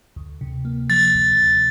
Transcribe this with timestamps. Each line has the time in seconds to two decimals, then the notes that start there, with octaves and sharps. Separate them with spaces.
0.16 D2
0.41 C3
0.65 A#3
0.89 F3 A6
1.14 D2
1.39 C3